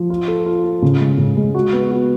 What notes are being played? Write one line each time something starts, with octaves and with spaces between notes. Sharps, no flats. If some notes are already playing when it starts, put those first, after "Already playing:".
Already playing: F3
F4
A4
F4
F4
C#3
G#3
C#3
G#3
F#4
B3
F#4